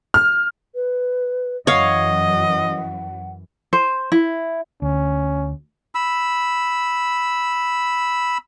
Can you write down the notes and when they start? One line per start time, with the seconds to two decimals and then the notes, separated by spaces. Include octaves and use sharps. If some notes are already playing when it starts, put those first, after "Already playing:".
0.14 F6
0.75 B4
1.67 F#2 E3 C#5 D#5 F5 F#5
3.73 C5
4.12 E4
4.82 D2 C#4
5.95 B5 E6